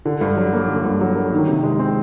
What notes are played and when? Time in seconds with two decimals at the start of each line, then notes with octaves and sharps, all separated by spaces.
0.05 D3
0.21 G2
0.37 F#3
0.53 A#3
0.68 D3
0.85 G2
1.01 F#3
1.16 A#3
1.33 D#3
1.48 C3
1.63 G#3
1.79 C4